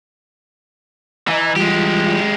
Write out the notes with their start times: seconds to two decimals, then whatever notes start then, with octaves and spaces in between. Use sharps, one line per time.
1.28 E3 D#5 A#5 E6
1.56 E3 G3 G#3 F4 G4